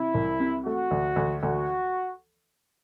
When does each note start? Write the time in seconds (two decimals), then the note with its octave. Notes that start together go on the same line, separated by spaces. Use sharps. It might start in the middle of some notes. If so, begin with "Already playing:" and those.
Already playing: C3 E4
0.14 C2
0.40 C3
0.65 A3 F#4
0.91 D2
1.16 D2
1.43 D2 F#4